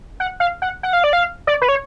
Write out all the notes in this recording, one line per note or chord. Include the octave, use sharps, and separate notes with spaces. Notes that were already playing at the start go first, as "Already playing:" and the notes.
F#5
F5
F#5
F#5
F5
D5
F5
D5
B4
C#5